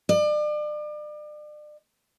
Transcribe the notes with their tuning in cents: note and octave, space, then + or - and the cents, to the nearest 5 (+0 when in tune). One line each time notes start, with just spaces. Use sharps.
D5 +35